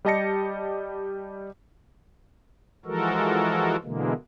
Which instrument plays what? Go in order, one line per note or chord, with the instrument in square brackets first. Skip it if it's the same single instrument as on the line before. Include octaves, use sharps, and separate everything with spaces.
[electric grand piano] G3 G4 D#5 A5 A#6 C#7
[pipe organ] E3 F3 G#3 F#4 A4 A#4
B2 D3 E3 G#3 A#3